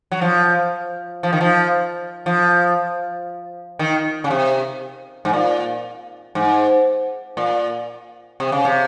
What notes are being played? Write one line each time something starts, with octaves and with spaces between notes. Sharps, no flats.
F#3
F3
F3
D#3
F3
F3
D#3
C#3
C3
G#2
A#2
G#2
A#2
C3
C#3
C3